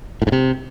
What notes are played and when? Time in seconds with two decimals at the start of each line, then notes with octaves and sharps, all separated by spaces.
0.22 A2
0.27 G#2
0.32 C3